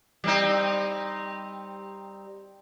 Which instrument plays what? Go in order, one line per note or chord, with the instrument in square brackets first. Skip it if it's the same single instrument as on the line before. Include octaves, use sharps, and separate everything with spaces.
[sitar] G3 C4 D#4